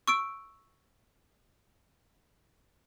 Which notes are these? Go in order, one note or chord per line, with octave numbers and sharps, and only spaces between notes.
C#6 E6 D7